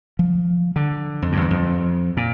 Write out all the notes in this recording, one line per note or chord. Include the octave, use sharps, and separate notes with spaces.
F3
D3
F2
G2
F2
E2
F2
A#2